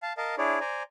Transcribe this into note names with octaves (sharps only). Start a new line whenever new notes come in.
F5 A5
A#4 D#5 F5 A5
D4 E4 G#4 C#5 D5
C5 D5 G#5 A#5